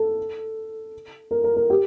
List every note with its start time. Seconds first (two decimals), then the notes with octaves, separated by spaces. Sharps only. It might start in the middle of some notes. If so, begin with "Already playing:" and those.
Already playing: A4
1.31 A#4
1.44 A#4
1.56 A#4
1.70 G4